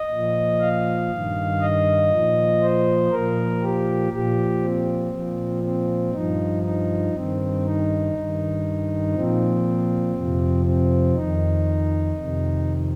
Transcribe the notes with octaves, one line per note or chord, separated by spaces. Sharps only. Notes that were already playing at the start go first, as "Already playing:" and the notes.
Already playing: D#5
A#2 F3
F5
G2 D#3
D#5
A#2 F3
C5
A#2 F3 A#4
G4
A#2 F3 G4
C4
A#2 F3
C4
G2 F3 D#4
D#4
G2 D#3 C4
D#4
G2 D#3
A#2 F3 C4
F2 C3 F3
C4
F2 D#3 D#4
F2 C3 D#3